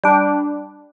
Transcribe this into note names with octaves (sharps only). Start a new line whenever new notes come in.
G3 D4